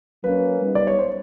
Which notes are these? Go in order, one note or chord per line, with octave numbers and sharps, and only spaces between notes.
F#3 A#3 C#4 B4
G3 B3 D#4
D5
C#5
C5